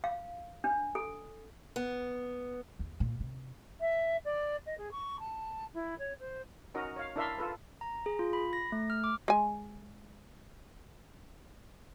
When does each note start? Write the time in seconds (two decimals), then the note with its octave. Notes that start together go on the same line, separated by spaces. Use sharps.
0.04 F5
0.64 D4
0.95 A4
1.76 B3
2.79 E2
3.00 A#2
3.20 C3
3.80 E5
4.24 D5
4.65 D#5
4.77 G#4
4.91 C#6
5.19 A5
5.74 E4
5.98 C#5
6.19 C5
6.74 C#4 D#4 F#4 A#4 D#5
6.96 C#5 F5
7.16 D4 E4 A#4 E5 F5 C6
7.38 F4 A4 B4
7.81 A#5
8.06 G#4
8.19 F4
8.33 B5
8.53 A#6
8.72 A3
8.90 F6
9.04 D6
9.28 G#3 G#5